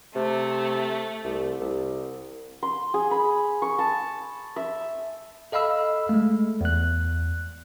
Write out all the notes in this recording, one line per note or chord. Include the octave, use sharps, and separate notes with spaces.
C3 A3
C2
C2
C6
G#4
B5
C#6
A5
E5
A4 D#5 F5 B5 E6
G#3 A3
E2 F#6